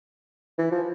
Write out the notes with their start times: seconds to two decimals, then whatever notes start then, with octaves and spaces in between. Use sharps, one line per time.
0.59 E3
0.72 F3